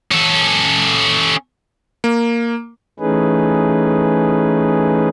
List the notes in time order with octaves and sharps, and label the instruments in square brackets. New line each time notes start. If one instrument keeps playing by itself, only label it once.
[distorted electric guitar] C#4 A4
[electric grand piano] A#3
[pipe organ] E3 A3 C#4 D#4 G#4 B4